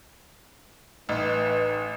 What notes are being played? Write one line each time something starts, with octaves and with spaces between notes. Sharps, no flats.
A1 D#4 B4